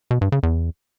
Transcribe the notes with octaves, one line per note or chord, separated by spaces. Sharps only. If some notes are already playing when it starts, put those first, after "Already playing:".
B2
G2
C#3
E2